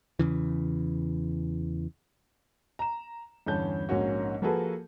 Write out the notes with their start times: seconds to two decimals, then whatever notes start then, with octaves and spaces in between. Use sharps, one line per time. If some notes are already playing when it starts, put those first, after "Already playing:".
0.19 E2 C#3 E3
2.79 A#5 E7
3.46 E2 G2 D3 C#4 A5 G6
3.89 A#1 G#2 A#3 C#4 F#4
4.42 F3 A#3 F#4 G#4 A4 B4